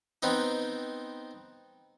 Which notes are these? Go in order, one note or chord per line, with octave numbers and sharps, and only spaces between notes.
B3 C4 D#4